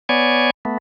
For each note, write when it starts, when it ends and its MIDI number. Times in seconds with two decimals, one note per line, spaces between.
0.09 0.50 59
0.09 0.50 73
0.09 0.50 74
0.09 0.50 80
0.65 0.78 57
0.65 0.78 59